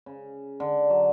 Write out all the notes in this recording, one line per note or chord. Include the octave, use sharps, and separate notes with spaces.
C#3
D3
F#3